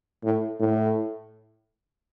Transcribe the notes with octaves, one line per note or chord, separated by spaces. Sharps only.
A2
A2